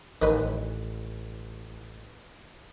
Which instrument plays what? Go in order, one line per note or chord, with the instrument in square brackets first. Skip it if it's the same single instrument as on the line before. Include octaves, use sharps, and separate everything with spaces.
[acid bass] A1 [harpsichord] D#3 B4